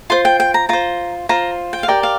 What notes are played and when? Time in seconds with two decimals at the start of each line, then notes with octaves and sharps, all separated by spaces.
0.10 F4 C5 C6
0.25 G5
0.40 G5
0.54 A#5
0.69 F4 C5 A#5
1.29 F4 C5 A#5
1.73 G5
1.83 F5
1.88 G4 A#4 D5 G5
2.03 F5